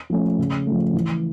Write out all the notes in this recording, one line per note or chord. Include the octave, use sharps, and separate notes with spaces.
F3 A3 C#4
C#3
F3 A3
E3